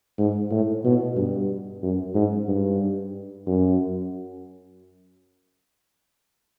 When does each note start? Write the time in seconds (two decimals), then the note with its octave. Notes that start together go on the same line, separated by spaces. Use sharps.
0.19 G#2
0.51 A2
0.84 B2
1.16 G2
1.83 F#2
2.15 G#2
2.48 G2
3.47 F#2